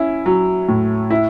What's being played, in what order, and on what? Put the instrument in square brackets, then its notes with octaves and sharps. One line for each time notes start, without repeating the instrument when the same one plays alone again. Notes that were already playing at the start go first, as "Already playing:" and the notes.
Already playing: [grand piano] C#4 E4
F#3
A2
E4